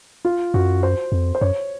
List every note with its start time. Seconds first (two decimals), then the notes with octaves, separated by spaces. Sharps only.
0.25 F4
0.54 F#2 F#4
0.83 C5
1.12 F2
1.35 C5
1.41 F#2 C#5